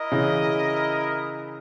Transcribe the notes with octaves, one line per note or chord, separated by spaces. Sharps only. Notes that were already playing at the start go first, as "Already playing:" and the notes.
Already playing: E4 A#4 D#5
C#3 E3